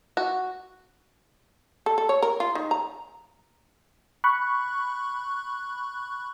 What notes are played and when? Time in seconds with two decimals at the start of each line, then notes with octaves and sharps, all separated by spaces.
0.17 F#4
1.86 A4
1.98 A4
2.09 C#5
2.22 A#4
2.40 F4
2.55 D#3
2.71 A#5
4.24 B5 C#6 F#6